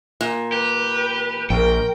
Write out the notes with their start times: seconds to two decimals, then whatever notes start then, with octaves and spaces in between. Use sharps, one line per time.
0.21 A#2
0.52 G4 B4
1.50 A#1 A#4 G5